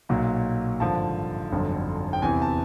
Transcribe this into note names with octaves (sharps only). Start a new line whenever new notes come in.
B1 A#2 F#3
G#1 G2 D3 F3 A5
G1 F2 D3 F#3
G5
E2 C3 E3 G#5
A5